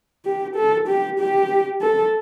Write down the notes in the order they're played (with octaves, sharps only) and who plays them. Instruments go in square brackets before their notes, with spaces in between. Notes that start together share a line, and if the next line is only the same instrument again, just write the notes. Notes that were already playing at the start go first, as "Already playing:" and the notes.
[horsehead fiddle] G4
A4
G4
G4
A4